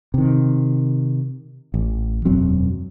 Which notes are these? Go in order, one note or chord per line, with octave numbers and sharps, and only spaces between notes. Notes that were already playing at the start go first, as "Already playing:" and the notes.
C3 D#3
A1
E1 F#2 F#3 C4